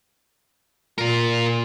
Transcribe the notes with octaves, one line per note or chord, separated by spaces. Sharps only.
A#2 F4 A#4